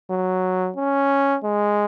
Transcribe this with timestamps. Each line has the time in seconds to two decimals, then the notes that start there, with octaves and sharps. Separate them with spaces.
0.11 F#3
0.77 C#4
1.44 G#3